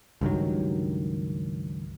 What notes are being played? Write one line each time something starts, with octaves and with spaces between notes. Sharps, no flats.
C#2 G2 D#3 F#3